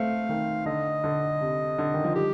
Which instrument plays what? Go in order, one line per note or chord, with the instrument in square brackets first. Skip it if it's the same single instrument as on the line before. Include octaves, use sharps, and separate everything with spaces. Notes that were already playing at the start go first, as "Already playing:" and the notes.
Already playing: [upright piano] A3 C4 [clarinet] F5
[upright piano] D#3
[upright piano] D3 [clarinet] D#5
[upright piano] D3
C3
D3
D#3
F3
[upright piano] G3 [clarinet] G4